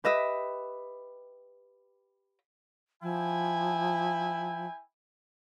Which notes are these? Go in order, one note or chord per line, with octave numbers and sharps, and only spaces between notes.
G4 B4 D#5 E5
F3 E4 G5 G#5